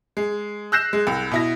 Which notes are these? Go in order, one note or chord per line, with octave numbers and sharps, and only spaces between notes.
G#3
E6 F#6 G6 A#6 C7 E7
G#3
C2
B2 E4 A#6